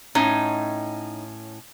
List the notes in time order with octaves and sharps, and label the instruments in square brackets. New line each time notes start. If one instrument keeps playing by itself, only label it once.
[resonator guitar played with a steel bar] A2 C#4 [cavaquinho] D#4